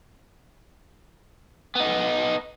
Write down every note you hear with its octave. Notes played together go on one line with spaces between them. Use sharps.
B3 D#4